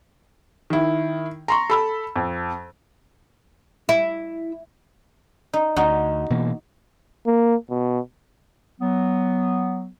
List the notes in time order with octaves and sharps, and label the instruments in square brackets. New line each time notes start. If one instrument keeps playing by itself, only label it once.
[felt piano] D#3 E4
A#5 C6 C#6
A4 B5 E6
F2
[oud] E4
[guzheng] D#4
[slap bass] D2 [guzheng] D#4 F#4
[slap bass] B2 E3 A#3
[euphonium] A#3
B2
[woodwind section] F#3 B3